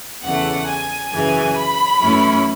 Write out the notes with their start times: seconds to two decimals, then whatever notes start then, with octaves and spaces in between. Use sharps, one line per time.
0.23 E2 C#3 E3 A3 F#5
0.67 G#5
1.12 F#2 C#3 E3 G#5
1.56 B5
2.01 F#2 E3 A3 C#4 E4